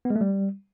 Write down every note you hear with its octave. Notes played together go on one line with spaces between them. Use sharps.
B3
G#3
A3
G3